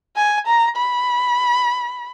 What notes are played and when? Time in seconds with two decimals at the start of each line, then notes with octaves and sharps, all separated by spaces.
0.17 G#5
0.47 A#5
0.78 B5